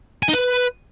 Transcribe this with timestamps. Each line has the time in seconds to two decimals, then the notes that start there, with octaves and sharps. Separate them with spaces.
0.23 G#5
0.28 D#4
0.33 B4